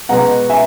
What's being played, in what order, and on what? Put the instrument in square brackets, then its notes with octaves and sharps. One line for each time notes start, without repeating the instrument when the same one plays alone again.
[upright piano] B2 G#3 B3 F#5 A#5
E5 G#5